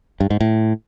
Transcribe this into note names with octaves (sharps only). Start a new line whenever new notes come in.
G2
G#2
A2